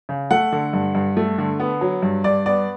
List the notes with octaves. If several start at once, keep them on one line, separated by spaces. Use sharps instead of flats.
C#3
A3 F#5
D3
G2
G2
A3
D3
B3
F#3
G2
G2 D5
B3 D5